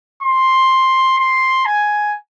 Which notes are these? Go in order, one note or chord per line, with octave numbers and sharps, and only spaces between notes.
C6
C6
G#5